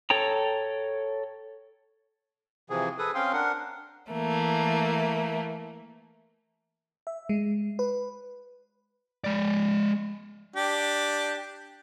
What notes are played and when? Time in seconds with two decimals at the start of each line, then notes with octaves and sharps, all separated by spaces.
0.10 A4 C#5 G5 A#5
2.70 C3 E3 F3 G#4
2.99 G#4 A4 B4 D#6
3.15 C4 C#4 F5 G5 C6
3.33 D4 A#4 F#5
4.11 E3 A3 A#3
7.07 E5
7.29 G#3
7.79 B4
9.24 G#3 D5
10.56 D4 G4